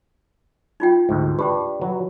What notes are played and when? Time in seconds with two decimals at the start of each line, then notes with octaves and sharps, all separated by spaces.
0.80 D#4 F4 G5
1.09 D2 G#2
1.39 D4 G4 B4 G5
1.82 F#3 B4